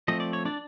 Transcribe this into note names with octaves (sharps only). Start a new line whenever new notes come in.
F3 A3 C4 D#5
D5
C#5
D4 D5